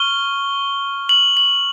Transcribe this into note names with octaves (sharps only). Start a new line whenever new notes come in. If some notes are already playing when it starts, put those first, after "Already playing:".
Already playing: C#6 F6 G7
F#7
F#7